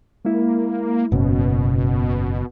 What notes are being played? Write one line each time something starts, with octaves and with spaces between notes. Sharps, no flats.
G#3 A#3 E4
F#1 G#2 B2 C#4